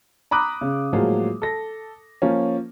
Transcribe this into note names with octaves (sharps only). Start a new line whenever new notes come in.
A#5 B5 D6 D#6 F#6
C#3
A2 F3 F#3 G#3 A#3
A4 A#6
F3 A#3 C#4